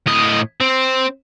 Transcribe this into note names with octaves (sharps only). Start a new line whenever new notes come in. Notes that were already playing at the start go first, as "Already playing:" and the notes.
A2 D#5
C4